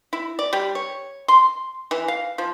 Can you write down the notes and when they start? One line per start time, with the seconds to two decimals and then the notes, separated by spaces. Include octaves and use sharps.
0.13 E4
0.39 D5
0.53 G3
0.75 C#5
1.28 C6
1.91 E3
2.08 F5
2.38 F3